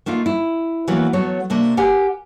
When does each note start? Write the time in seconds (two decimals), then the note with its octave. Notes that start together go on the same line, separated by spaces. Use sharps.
0.06 A3 A#3 D#4 F4
0.26 E4
0.88 E3 F#3 A#3 B3
1.13 F#3 A3 B3 C#5
1.50 C3 A3 A#3 D4
1.77 G4 A#4 F#5 G#5